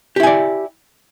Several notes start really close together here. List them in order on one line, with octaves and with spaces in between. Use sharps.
G4 E4 G#5 D5